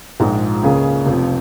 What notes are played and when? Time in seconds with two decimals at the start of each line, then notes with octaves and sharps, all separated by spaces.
0.20 A#1 G#2 F3 G#3 D#4
0.63 C#2 C#3 A#3 C#4 G#4
1.06 F1 F2 F3